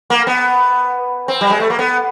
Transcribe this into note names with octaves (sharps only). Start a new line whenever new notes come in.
A#3
B3
C4
G3
G#3
A3
A#3
B3